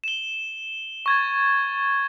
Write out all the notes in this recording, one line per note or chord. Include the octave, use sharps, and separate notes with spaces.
E7 G7
C#6 G#6 A6